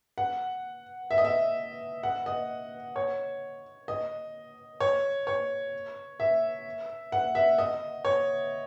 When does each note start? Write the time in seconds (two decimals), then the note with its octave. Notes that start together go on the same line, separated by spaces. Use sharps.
0.18 F#5
1.11 E5
1.18 D#5
1.25 E5
2.03 F#5
2.26 D#5
2.96 C#5
3.88 D#5
4.80 C#5
5.27 C#5
6.20 E5
7.12 F#5
7.35 E5
7.58 D#5
8.05 C#5